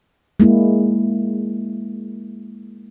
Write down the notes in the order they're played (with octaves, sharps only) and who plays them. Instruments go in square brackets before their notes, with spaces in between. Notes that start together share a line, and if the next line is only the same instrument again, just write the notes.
[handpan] G#3 A#3 E4